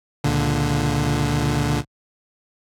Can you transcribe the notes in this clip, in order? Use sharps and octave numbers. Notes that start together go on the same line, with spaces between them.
C#2 A#2 D3